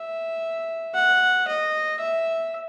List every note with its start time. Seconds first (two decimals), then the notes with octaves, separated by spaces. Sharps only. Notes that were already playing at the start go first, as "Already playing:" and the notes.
Already playing: E5
0.95 F#5
1.48 D#5
2.00 E5